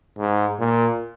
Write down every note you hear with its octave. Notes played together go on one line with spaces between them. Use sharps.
G#2
A#2